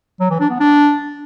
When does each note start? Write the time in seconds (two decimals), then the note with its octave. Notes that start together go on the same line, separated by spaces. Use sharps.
0.20 F#3
0.30 E3
0.40 D4
0.50 B3
0.60 D4